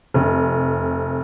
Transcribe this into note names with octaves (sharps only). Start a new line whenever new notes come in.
F1